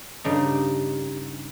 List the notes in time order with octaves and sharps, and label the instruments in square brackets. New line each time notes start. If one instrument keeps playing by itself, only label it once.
[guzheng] G2 C#3 D#4